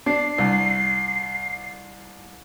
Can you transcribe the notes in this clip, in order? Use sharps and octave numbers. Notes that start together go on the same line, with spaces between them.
D4 C7
C2